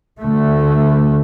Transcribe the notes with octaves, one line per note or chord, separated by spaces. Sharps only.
D2 D3 A3